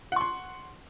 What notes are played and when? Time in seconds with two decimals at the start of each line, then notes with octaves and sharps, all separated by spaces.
0.12 F#5
0.16 C#6
0.21 C6